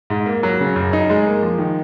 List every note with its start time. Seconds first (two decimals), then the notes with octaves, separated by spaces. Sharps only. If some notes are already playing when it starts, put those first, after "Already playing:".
0.10 G#2
0.26 A#3
0.43 F#3
0.60 C#3
0.76 F#2
0.93 D#4
1.10 G#3
1.26 A#3
1.43 F3
1.58 D#3